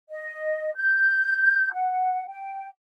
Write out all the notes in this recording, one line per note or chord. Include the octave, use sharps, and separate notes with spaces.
D#5
G6
F#5
G5